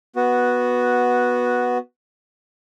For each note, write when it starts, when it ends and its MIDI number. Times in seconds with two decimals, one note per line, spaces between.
0.16 1.78 59
0.16 1.78 66